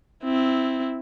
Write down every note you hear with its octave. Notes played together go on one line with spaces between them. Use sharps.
C4 E4